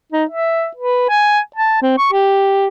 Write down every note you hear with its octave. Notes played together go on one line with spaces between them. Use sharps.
D#4
E5
B4
G#5
A5
C4
C#6
G4